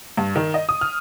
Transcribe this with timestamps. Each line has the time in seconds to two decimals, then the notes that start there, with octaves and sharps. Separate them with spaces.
0.17 G2
0.36 D#3
0.54 D#5
0.69 D#6
0.81 F6